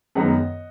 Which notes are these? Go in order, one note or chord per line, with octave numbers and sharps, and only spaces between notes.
F#2 D#3 G#3 B3 D#5 F#5